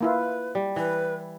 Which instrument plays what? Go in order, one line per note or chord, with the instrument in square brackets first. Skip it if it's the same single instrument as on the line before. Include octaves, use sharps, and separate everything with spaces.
[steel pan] A#3 E4 F4 [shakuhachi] B4
[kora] G3
[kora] E3 [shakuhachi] B4